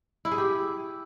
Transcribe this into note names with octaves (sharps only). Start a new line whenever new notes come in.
E4
G#4
G4